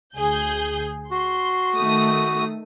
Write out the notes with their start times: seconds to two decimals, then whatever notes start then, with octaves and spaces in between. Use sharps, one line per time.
0.16 D2 G#4 G6
1.11 F#4 C6
1.76 D#3 A3 D#6